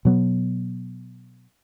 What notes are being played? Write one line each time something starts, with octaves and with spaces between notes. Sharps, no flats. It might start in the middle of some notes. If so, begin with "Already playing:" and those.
B2 F#3 B3